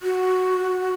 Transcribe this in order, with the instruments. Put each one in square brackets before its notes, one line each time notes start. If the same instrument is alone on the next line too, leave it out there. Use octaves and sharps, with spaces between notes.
[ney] F#4